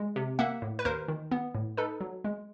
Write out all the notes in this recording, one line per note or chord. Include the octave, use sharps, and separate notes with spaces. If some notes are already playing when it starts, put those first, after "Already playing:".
Already playing: G#3
C3
A#3 E5 F#5
A2
B4
D#2 A#4 C5
D#3
B3
A2
D#4 A4 B4
F#3
G#3